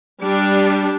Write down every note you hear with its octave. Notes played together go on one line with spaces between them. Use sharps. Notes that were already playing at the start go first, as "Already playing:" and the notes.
G3 D4